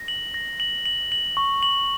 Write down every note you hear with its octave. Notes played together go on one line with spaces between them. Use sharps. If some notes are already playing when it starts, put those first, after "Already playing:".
Already playing: A#6
F#7
A#6
F#7
F#7
F#7
C#6
F#7